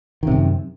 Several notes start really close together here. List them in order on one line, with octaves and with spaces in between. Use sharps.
D#3 C3 F#2